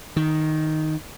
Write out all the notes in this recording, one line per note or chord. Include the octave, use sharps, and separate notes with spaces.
D#3